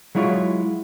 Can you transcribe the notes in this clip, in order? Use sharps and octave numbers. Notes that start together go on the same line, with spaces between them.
F#3 G#3 E4 F4 C#5